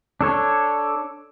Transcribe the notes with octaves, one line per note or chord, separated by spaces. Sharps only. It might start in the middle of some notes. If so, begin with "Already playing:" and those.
D4 A4 C#5